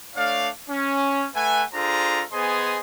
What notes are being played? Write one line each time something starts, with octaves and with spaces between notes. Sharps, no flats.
A3 D4 C#5 D5 F5
C#4
A3 B4 E5 F#5 G#5
D4 F4 G#4 A4 C5 A#5
B3 G#4 C5 D#5 G#5 C6